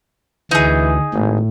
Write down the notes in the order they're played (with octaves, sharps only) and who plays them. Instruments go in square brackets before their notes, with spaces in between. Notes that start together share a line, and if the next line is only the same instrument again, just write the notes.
[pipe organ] D2 [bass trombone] E3 [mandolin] D#4 G#4
[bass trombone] G#1 [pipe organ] A2